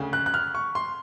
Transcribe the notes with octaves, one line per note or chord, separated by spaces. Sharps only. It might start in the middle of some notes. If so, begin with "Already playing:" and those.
Already playing: D2 C#3
F#6
F#6
F6
C#6
C6